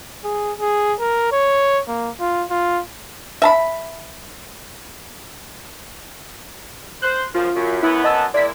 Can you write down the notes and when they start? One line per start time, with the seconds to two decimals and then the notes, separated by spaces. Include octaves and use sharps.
0.24 G#4
0.60 G#4
1.00 A#4
1.32 C#5
1.88 A#3
2.20 F4
2.50 F4
3.42 E5 A5 B5
7.02 C5 F#6
7.34 F#2 F3 F4
7.55 F#2
7.83 F#2 F#3 B3 E4
8.04 D#5 A5 E6
8.34 G#3 A#3 E4 D5 B6